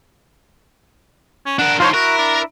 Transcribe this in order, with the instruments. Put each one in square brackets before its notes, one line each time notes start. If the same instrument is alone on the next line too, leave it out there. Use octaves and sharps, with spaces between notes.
[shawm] C#4
[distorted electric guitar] D4 A#4 [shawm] F#5
[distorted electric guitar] D#3 F3 [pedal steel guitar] F4 C5 C#5 [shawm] C6
[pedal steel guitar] E4 [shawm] F#4 [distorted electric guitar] A#4
[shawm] D4